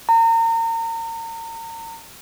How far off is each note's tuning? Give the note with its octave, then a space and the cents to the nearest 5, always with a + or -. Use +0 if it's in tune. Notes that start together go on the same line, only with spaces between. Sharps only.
A#5 -35